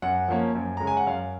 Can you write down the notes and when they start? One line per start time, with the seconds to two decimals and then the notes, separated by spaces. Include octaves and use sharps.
0.02 F#2 F#5
0.28 F3 A#3 C#4
0.55 F#2
0.77 C#3 G#3 C#4 A#5
0.87 G#5
0.97 F#5
1.07 F#2 F5